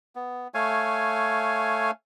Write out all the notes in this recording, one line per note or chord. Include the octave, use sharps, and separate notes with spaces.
B3
A3 C#5 F5 G#5